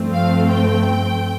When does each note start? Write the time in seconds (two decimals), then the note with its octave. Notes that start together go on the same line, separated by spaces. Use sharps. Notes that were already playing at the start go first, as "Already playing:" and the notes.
Already playing: G2 F3 A3 C4
0.13 F5
0.49 G5